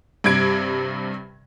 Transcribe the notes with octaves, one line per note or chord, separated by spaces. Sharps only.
G2 C3 G#6 D7